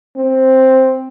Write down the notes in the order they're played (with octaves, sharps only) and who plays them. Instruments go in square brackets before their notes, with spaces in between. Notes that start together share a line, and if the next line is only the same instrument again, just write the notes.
[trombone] C4